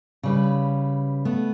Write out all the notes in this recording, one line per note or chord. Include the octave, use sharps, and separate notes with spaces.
C#3 G3 B4
A3 B3